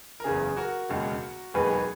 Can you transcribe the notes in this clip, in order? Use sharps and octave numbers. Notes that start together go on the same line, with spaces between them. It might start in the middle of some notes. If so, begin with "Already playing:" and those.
A#4
F#1 E2 C#3 G#4
F#4 A#4
E1 D#2 C#3 G#3
E1 D#2 D#3 F#3 G#4 B4
G#4 B4